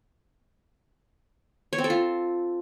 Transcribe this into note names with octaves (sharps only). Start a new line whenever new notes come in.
C#5
C4
A4
F4